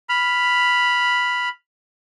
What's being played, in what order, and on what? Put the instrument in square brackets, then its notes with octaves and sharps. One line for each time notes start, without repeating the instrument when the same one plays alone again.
[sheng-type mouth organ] B5 F6